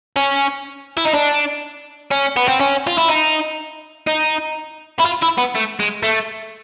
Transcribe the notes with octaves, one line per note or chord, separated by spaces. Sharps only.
C#4
E4
D#4
D4
C#4
B3
C4
C#4
F4
E4
D#4
D#4
E4
F4
E4
B3
A3
G#3
A3